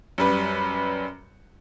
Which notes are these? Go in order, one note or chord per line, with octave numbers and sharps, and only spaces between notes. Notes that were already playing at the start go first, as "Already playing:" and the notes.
F#2 G3 B4